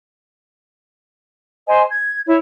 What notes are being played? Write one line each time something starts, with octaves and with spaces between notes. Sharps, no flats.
C5 D#5 G#5 C6
G#6
E4 C#5